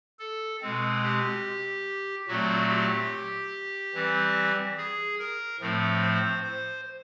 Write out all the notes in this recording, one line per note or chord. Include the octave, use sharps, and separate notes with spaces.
A4
B2 G#3 C4
G4
A#2 F#3 A3 C4 F#4
G4
E3 G3 C4
G#4
A#4
A2 F3 A3 C4
C5
C5